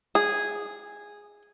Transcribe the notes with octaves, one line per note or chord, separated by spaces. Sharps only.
G#4